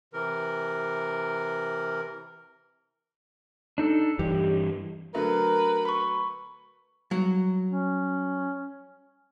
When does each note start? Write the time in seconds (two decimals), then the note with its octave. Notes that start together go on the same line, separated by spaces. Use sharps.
0.13 C3 E3 A#4
3.78 D4 D#4 A4
4.19 G2 E3 G4
5.15 D3 F#3 A3 A#4 B4
5.85 B5 C#6
7.11 F#3 G3
7.71 C#4